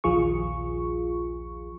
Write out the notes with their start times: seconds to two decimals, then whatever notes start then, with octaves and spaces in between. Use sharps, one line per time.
0.04 A#1 D#2 F3 F4 G#4 C#6